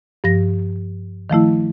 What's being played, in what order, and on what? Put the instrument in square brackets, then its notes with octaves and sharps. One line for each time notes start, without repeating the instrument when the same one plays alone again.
[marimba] G2 F3 A#6
D#3 F3 A3 E4